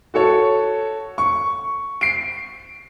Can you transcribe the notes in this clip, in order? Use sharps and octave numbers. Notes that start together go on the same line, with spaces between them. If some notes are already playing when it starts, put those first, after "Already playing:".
F#4 A4 C#5
C#6
C7 D7